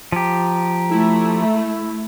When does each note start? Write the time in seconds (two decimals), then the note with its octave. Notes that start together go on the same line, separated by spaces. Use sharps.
0.12 F3 G4 A#5
0.91 A3 E4